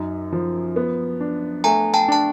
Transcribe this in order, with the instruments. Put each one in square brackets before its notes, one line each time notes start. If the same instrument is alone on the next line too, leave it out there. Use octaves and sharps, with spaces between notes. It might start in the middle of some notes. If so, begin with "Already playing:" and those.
Already playing: [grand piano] F#2 D#4
F3
B3
D4
[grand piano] A3 [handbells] G#5 A#5
[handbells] G5 A5
[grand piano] D4 [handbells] A5